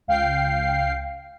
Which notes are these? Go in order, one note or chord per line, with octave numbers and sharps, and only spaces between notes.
C#2 F5 G5 C7